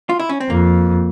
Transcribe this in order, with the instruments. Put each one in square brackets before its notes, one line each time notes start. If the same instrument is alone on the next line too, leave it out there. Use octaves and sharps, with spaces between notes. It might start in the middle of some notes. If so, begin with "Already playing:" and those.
[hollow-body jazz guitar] F4
E4
C#4
C4
[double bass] F2 [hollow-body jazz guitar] A#3